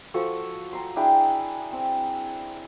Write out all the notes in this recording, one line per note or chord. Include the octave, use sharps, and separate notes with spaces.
F3 F#4 A4 C#6
A#5 C6
D4 E4 G#4 G5
C4